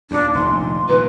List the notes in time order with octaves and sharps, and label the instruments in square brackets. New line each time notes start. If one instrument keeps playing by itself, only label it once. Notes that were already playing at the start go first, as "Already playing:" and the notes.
[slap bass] D#2 A#2 [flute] D4
[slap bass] F1 A#1 D#3 [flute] C6
[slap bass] A#2 D3 D#3 [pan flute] B4